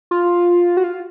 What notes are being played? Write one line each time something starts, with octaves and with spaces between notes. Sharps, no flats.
F4
F#4
F4